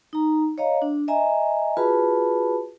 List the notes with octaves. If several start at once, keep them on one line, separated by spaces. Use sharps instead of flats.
D#4 A#5
C#5 D#5 F5 A#5
D4
D#5 E5 G#5 A#5
F4 F#4 G#4 B4 A5 B5